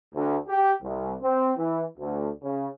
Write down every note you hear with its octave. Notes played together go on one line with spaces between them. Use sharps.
D2
G4
C2
C4
E3
D2
C#3